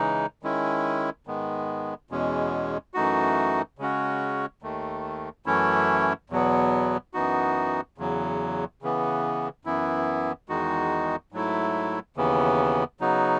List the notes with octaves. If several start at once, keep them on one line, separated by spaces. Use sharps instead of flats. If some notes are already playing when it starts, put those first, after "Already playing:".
Already playing: C#3 E3 G#3 D#4
D#3 G#3 C#4 E4
G#2 D#3 G#3 B3
E2 B2 G#3 C#4
F#2 E3 A3 D#4 F#4
C#3 G#3 C#4 F#4
D#2 D#3 A3
F#2 E3 A3 C#4 E4
E2 B2 F#3 B3
F#2 E3 B3 D#4 F#4
E2 C#3 F#3
C#3 E3 B3
F#2 E3 B3 E4
E2 D#3 G#3 D#4 F#4
G#2 F#3 A3 E4
D#2 C#3 E3 B3
C#3 F#3 B3 D#4 F#4